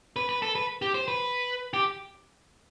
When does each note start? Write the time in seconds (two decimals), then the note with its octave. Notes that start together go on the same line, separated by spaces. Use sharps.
0.16 B4
0.29 B4
0.42 A4
0.55 B4
0.82 G4
0.94 C5
1.08 B4
1.74 G4